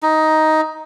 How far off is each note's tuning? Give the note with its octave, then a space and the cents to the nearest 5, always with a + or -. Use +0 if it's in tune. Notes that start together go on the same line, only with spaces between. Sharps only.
D#4 +10